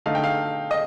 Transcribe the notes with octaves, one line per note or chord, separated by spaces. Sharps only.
D3 A3 D#4 F5
G5
F5
D#5